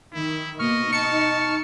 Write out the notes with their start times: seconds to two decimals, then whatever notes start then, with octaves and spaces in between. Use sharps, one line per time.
0.13 D#3 E4
0.59 B2 A#3 D#5 C#6 F6
0.93 D#4 A5 C#7